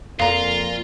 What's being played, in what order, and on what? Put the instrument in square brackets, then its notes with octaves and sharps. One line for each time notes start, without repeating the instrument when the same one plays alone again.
[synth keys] F2 A#5 [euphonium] A#2 [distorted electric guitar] F4 [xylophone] F5